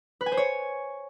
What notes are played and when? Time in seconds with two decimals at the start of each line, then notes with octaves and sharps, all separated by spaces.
0.21 B4
0.26 G#5
0.32 C5
0.37 C#5